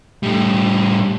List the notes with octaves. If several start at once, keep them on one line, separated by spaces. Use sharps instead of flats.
A2 G3